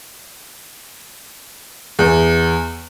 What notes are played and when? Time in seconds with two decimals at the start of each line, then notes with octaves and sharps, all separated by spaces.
1.99 E2